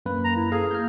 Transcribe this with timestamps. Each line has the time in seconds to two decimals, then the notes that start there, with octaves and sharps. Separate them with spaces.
0.06 F#2 A#3 B4
0.25 A#5
0.37 E4
0.52 G#4 A4 F5
0.71 A#3 F6 G6